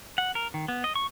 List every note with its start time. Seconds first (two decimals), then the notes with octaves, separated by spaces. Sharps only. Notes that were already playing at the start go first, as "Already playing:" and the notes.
0.18 F#5
0.35 A#4
0.54 D#3
0.68 B3
0.84 D#5
0.96 C#6